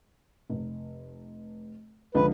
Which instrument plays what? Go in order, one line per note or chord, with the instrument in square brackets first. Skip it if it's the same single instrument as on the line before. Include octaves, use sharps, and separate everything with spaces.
[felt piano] F1
[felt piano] C#2 D3 F3 [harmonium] B4